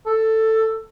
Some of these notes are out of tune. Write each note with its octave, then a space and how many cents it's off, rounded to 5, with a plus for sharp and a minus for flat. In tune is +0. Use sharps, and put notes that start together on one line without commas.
A4 +10